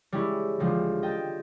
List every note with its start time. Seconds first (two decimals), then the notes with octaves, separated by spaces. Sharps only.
0.12 G3 G#3 C#4 E4
0.59 D2 F3 G3 G#3
1.03 D#5 G5 A5